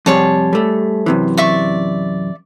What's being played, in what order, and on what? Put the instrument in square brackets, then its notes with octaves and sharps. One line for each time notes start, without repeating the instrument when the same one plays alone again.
[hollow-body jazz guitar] F2 C3 G3 [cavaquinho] G#4 C#5 A5
[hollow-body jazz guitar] G3 A3
F#2 C3 E3
[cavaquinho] D5 E5 C#6